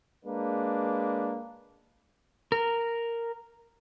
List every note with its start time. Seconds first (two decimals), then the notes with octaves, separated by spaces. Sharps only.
0.25 G#3 A#3 D4 B4
2.52 A#4